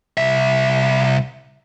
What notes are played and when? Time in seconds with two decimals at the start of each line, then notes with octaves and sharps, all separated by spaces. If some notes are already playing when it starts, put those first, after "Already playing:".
0.18 C2 E5